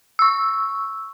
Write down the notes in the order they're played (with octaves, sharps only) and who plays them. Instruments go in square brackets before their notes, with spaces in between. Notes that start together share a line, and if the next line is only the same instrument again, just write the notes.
[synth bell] C#6 E6